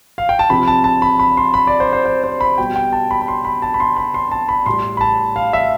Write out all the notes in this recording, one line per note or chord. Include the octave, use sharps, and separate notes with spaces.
F5
G5
A5
C3 F3 B5
A5
A5
B5
B5
C6
B5
D5
C5
C5
C5
C5
B5
B2 G3 G5
G5
A5
B5
B5
C6
B5
A5
B5
C6
B5
C6
A5
B5
A2 G3 C6
B5
A5
F5
E5